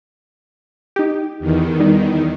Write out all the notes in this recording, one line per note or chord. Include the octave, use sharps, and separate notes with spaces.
D#4 G4
E2 D#3
G3 D#4